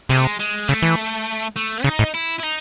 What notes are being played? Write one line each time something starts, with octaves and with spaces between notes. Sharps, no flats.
C3 G#3
A3
G#3
G#3
C#3 A3
E3
A3
C#3 D#4
A2
E4
E4
D#4